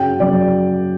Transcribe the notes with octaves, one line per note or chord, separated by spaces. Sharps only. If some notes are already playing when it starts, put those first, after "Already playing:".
Already playing: F#2 C#3 F#3 G5
F#2 C#3 F#3 D5